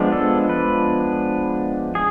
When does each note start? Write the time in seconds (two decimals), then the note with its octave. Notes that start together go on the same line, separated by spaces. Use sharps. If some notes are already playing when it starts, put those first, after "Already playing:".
Already playing: F3 G#3 B3 D4
0.12 A4
0.49 B4
1.95 G#4